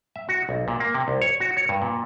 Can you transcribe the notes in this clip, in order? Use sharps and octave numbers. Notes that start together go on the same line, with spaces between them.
E5
F#4
B1
A#2
A#3
C3
C2
C#5
F#4
C#5
G2
A#2